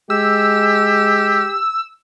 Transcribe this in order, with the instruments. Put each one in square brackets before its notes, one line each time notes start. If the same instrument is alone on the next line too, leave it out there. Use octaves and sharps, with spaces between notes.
[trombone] G#3 [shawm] G4 [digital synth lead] E6